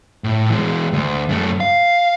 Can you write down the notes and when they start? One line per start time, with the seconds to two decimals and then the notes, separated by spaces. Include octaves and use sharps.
0.24 A2
0.50 E3 G#3
0.93 D2
1.29 F#2 A3
1.60 F5